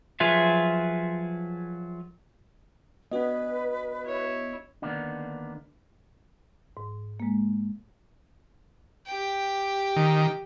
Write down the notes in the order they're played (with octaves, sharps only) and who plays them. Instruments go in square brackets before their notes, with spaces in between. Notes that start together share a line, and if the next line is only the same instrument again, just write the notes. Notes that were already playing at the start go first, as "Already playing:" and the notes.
[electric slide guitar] F3 F#3 F4 G#4 B4 E5
[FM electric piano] B3 F#4 [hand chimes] D4 D#5 [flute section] B4
[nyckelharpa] E4 C#5
[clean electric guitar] D2 D3 D#3 A#3 B3 D4
[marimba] G#2
G#3 A#3
[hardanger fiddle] G4 G5
[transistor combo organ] D#3